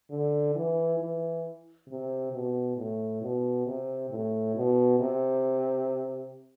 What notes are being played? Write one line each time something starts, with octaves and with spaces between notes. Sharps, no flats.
D3
E3
E3
C3
B2
A2
B2
C3
A2
B2
C3